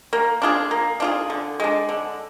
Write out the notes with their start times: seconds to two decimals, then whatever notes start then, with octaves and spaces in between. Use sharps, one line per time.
0.13 A#3
0.42 D4 F4 G#4
0.71 A#3
1.00 D4 F4 G#4
1.30 D3
1.60 G#3 D4
1.89 D3